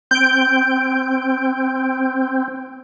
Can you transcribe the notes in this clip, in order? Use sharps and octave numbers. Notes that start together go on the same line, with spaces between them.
C4 G6 D7